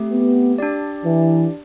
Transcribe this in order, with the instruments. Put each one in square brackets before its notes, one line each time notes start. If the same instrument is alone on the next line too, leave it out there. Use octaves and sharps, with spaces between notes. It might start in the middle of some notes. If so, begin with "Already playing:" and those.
Already playing: [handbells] A3 C4 G4
[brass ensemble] B3
[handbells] D4 G4 D5
[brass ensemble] E3